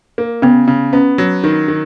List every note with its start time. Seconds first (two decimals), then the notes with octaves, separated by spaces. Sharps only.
0.18 A#3
0.42 C#3 B3
0.68 C#3
0.93 B3 C#4
1.18 F#3
1.44 D#3
1.68 D#3